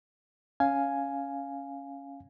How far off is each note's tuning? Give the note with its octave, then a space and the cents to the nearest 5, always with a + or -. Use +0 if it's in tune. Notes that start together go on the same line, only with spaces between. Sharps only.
C#4 +0 F5 +0 G#5 +5